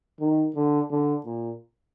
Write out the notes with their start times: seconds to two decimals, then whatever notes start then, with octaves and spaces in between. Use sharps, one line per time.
0.20 D#3
0.56 D3
0.91 D3
1.25 A#2